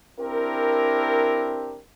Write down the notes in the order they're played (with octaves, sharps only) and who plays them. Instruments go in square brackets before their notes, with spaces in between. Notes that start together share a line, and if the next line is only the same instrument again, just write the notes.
[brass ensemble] C4 D4 E4 G4 A#4